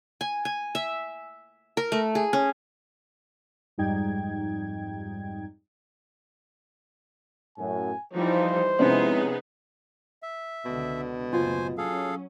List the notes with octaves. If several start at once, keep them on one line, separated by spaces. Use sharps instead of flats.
G#5
G#5
E5
A#4
A3
G#4
C#4
F2 G#2 G3 D#4 G5 G#6
F#2 A2 G#5
E3 F3 G3 D#4 C5
C3 F3 G#3 B3 C#4 D#4 E4 G#4
E5
C#2 B2 D3
F#1 A2 F4 C5 G#5
F#3 C#4 G#4 A4 F5